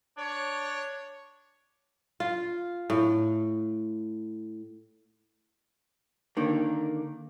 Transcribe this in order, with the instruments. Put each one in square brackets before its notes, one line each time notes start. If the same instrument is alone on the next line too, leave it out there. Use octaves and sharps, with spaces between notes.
[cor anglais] D4 [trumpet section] C#5
[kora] F4
A2
[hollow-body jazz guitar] D3 D#3 A#3